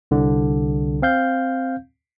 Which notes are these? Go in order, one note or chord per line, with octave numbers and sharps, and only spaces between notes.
C2 D3
C4 F5 G6